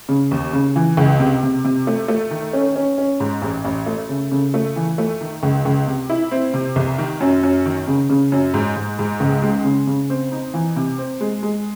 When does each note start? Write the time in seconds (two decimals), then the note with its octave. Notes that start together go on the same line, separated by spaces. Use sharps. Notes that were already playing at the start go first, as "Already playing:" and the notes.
0.09 C#3
0.31 D#2
0.53 C#3
0.76 E3
0.97 C#2
1.19 C3
1.43 C3
1.64 C3
1.87 A3
2.08 A3
2.31 D#3
2.53 C#4
2.76 C#4
2.98 C#4
3.20 G#2
3.42 A1
3.65 A1
3.86 A3
4.09 C#3
4.32 C#3
4.54 A3
4.76 E3
4.98 A3
5.21 D#3
5.43 C#2
5.65 C#2
5.87 C3
6.10 E4
6.31 C4
6.54 C3
6.76 C2
6.98 D#3
7.20 F#2
7.43 F#2
7.65 D#3
7.88 C#3
8.10 C#3
8.32 F#2
8.54 G#2
8.76 G#2
8.99 G#2
9.20 C#2
9.42 G#3
9.64 C#3
9.87 C#3
10.10 C4
10.32 D#4
10.54 E3
10.76 C3
10.98 C4
11.21 G#3
11.43 G#3